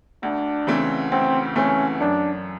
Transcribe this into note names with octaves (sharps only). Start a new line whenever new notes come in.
D2 D4
C#3 E3 A3 C4
D2 C4
C#3 E3 A3 C4 C#4
F#2 D4